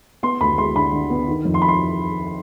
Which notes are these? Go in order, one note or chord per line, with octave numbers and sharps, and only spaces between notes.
B3 C6
D2 B5
G#3 C6
D3 B5
D3
B3
D#3
F2
C6
B5
C6